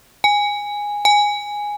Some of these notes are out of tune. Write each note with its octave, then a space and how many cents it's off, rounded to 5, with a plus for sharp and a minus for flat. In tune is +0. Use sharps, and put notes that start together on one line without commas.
G#5 -10
G#5 -5